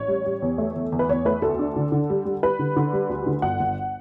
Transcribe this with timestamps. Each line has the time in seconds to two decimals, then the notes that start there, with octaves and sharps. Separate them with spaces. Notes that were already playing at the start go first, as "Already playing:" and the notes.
Already playing: A1 C#5
0.08 G3
0.26 G3
0.42 E2
0.58 A3
0.76 E2
0.92 E2
0.99 B4
1.09 E2 C#5
1.25 A3 B4
1.42 D2 A4
1.59 D4
1.76 D3
1.92 D3
2.10 G3
2.25 G3
2.43 G3 B4
2.59 D3
2.76 D3
2.93 G3
3.09 D2
3.26 D3
3.42 G1 F#5
3.60 G1